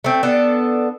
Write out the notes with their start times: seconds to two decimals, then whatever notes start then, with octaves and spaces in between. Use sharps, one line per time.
0.04 A3 C4
0.23 B3 D4 A4